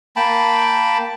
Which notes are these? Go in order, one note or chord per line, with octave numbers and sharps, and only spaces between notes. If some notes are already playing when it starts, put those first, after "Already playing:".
A#3 G5 A5 B5